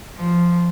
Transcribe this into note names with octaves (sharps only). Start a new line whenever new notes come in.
F3